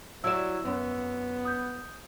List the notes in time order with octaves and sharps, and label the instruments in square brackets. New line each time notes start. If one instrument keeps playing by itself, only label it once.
[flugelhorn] F#3 [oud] E4 D5 [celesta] E6 E7
[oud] F#2 [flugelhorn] B3
[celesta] D#6 G6